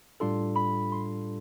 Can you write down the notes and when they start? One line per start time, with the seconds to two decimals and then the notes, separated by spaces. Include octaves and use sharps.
0.20 A2 G3 D4 F4 A4 C6
0.56 B5
0.92 C6